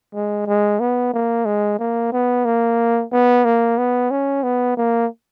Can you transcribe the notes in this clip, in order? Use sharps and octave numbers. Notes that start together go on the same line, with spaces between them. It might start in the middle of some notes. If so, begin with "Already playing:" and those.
G#3
G#3
B3
A#3
G#3
A#3
B3
A#3
B3
A#3
B3
C#4
B3
A#3